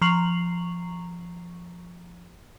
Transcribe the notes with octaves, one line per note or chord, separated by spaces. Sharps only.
F3 A#5 C#6 C7 F7 F#7